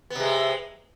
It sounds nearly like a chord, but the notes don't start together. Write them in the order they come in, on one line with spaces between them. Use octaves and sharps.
B3 C3 G#3